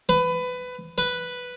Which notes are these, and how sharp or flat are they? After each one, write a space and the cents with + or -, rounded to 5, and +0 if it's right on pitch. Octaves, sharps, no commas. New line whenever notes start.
B4 +20
B4 +0